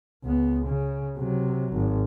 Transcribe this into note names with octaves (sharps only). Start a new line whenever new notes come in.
C#2 B3
C#3
C3 F#3
G#1